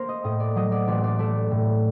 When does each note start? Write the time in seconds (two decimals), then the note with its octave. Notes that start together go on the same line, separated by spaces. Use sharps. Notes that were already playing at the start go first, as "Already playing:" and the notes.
Already playing: A#3 A#4 C5
0.09 D#5
0.24 A2 D#5
0.40 D5
0.56 F#3 D#5
0.72 D5
0.88 A1 D5
1.04 D5
1.19 A3 D5
1.51 A2